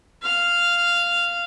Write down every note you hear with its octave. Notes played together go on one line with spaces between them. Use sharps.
F5